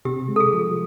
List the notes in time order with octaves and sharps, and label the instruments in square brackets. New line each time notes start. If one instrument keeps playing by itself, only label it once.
[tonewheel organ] C3 [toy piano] G4
[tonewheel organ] G#3
[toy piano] A4
G#4
[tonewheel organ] F3